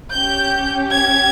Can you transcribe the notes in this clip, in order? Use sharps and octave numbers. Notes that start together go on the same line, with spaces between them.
C#4 G4 G6
G#6